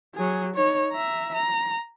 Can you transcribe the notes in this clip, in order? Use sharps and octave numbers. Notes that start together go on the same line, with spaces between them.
F#3 G#4
D#4 C#5
E5 A#5
A#5